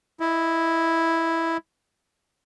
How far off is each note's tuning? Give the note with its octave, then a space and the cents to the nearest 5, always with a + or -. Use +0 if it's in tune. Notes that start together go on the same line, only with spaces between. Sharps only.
E4 +0 D#5 +15